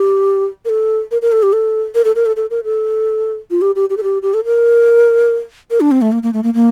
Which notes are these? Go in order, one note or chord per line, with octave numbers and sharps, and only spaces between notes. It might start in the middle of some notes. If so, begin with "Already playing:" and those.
Already playing: G4
A#4
A4
A#4
A#4
A4
G4
A4
A#4
A4
A#4
A4
A4
A#4
A4
F4
G4
G4
G4
A4
G4
G4
A4
A#4
A#4
D4
C4
A3
A#3
A#3
A3
A#3
A#3